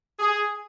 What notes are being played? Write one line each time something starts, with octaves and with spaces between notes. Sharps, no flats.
G#4